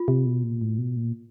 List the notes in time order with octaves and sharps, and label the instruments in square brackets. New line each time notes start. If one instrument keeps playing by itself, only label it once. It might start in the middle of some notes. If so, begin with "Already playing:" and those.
Already playing: [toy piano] F4
[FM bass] C3
B2
A#2
A2
B2
A#2